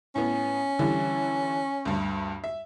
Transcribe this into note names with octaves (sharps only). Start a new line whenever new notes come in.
A2 B3 C#4
D3 E3 G3
D2 G2
E5